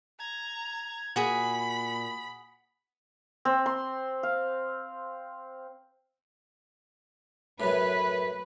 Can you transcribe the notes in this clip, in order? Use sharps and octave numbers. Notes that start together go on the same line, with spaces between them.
A#5 G#6
A#2 F#4 G#4 B5
C4
C6
F5
F#2 A2 B4